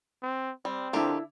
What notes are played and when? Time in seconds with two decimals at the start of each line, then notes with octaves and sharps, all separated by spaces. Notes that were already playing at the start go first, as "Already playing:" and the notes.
0.22 C4
0.65 G3 C4
0.93 D3 D#3 F3 D4 E4 G4